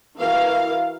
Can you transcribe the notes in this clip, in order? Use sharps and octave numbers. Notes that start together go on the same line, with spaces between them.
E3 F#4 A#4 F5